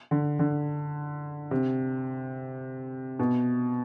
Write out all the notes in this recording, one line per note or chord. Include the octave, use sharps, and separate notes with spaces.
D3
D3
C3
B2